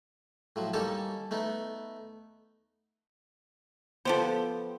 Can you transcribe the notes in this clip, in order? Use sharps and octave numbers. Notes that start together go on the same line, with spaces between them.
A2 F3 F#3
G3 A#3 C#4 D#4 A4 A5
A3 B3 D#4
F3 B3 G4 A4 C5